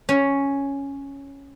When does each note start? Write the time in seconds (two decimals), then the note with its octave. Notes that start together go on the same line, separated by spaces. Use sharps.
0.09 C#4